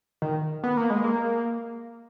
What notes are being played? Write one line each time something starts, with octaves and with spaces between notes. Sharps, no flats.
D#3
B3
A#3
G#3
A#3